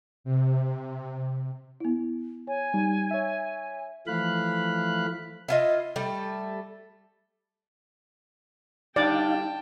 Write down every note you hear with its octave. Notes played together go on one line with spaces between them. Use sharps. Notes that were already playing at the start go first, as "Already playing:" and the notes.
C3
B3 E4
C#5 G#5
G3 D#4
C#5 E5
E3 F3 A3 F5 B5 F#6
E4 F4 D#5
G3 A3
D3 G3 D4 D#4 D5 F5 G5 A5